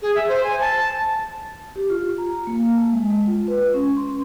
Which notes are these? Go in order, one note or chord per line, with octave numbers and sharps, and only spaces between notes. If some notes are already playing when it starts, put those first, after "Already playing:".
G#4
E5
C5
G#5
A5
G4
F4
A#5
A#3
A5
G#3
G#3
F4
B4
C#4
C6